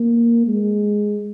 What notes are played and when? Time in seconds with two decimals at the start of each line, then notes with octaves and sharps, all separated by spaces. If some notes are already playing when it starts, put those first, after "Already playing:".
Already playing: A#3
0.47 G#3